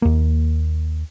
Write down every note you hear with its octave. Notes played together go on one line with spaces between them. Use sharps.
D#2 A#3